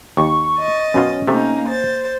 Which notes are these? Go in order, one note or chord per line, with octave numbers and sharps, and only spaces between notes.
D#2 C#6
D#5 A6
F#2 B2 C#4 F4
C3 A3 A#3 D#4
C5 A6